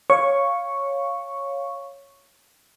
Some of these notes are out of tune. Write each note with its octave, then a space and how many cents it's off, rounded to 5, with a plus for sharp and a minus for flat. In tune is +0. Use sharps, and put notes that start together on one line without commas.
C#5 +0 F5 +0 C#6 +0